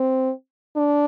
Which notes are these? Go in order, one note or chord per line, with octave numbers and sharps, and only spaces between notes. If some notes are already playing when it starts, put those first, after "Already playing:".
Already playing: C4
D4